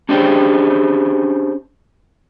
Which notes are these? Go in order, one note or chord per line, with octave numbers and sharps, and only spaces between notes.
C#4 D4 G4 G#4 C5 G5